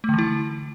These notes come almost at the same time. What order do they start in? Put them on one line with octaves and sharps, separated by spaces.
A3 D3 E3 E4